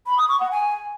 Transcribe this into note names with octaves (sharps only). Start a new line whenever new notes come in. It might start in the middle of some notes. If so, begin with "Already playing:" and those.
B5
D#6
C#6
F#5
G#5